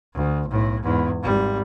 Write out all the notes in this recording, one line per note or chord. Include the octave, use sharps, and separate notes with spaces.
D2
B1 A2
E2 G#2
G#1 G3